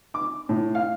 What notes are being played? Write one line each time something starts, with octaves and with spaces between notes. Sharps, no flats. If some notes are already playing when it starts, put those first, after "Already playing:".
D6
A2
F5